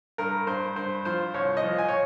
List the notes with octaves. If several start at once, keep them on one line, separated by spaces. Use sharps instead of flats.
G2 A#4
G2 C5
G2 C5
F3 C5
C2 C#5
D#5
F3
G#5
C#5